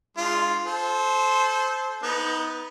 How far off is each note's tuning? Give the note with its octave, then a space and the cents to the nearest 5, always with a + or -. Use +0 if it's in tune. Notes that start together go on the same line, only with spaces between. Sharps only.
G#3 +0 D4 +35 F4 +0
A4 -30 C5 +0
B3 +0 D#4 +25